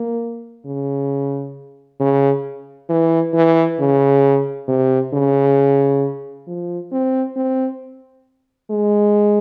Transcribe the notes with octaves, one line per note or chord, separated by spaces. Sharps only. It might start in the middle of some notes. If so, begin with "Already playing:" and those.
Already playing: A#3
C#3
C#3
E3
E3
C#3
C3
C#3
F3
C4
C4
G#3